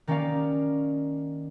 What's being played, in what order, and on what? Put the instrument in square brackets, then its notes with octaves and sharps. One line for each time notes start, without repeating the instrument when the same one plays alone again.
[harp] D#3 A#3 C#4 D#4 D5 F5